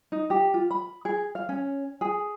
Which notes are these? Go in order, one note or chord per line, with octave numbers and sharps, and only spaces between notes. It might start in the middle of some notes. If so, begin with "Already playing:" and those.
D#4
G4
F4
B5
G#4
F5
C#4
G#4